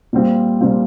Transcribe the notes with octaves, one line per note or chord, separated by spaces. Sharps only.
A#2 G3 C4 F4
A#2 G3 C4 F4